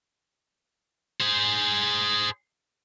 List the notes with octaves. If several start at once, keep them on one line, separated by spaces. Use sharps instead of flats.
G#4 C5